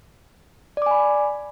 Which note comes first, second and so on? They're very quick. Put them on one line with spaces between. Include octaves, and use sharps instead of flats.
D5 D6 G#5 B5